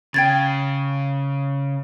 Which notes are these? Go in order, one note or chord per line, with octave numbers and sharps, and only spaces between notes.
C#3 G5 G#6 A6